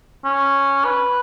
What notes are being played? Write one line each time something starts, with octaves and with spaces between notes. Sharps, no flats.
C#4
B4